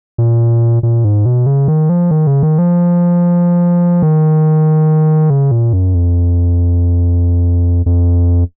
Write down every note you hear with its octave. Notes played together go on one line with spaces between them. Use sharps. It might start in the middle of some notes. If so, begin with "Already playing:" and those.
A#2
A#2
G#2
B2
C#3
D#3
F3
D#3
C#3
D#3
F3
D#3
C#3
A#2
F#2
F2
F2